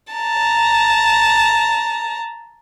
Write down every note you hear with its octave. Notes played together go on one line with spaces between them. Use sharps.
A5 A#5